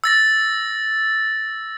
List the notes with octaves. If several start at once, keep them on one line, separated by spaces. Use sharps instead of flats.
E6 A6 A#6